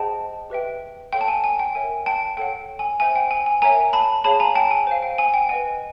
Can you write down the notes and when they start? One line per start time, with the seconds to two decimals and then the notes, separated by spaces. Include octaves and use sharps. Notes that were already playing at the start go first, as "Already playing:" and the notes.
Already playing: G#4 C5 D#5 F#5 G5 A5
0.50 G4 B4 E5 G5
1.12 A4 C#5 F5 G5
1.21 A5
1.28 G#5
1.44 G#5
1.59 G5
1.75 A#4 C#5 E5 G5 G#5
2.06 G5 A5
2.37 A4 C#5 F#5 G5
2.79 G#5
3.00 C5 E5 G5 G#5
3.15 G5
3.31 G#5
3.46 G#5
3.62 A#4 C#5 E5 G5 G#5 A#5
3.93 A5 B5
4.24 G#4 C#5 F5 A5 B5
4.40 G#5 A#5
4.55 G5 A5
4.71 G#5
4.87 C5 F5
5.02 G5
5.18 G#5
5.34 G5
5.49 B4 D#5 F#5 G#5